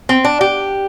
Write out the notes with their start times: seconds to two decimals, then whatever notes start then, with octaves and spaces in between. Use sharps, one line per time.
0.09 C4
0.24 D4
0.41 G4